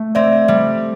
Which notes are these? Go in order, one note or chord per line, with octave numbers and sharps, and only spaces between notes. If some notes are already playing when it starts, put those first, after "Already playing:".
Already playing: A3
C4 D5 E5
G3